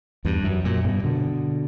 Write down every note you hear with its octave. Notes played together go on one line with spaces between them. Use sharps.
E2 G2
F#2
F#2 A#2
G2 B2
B2 D3